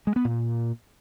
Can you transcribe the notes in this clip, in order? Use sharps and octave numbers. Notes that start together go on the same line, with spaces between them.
G#3
B3
A#2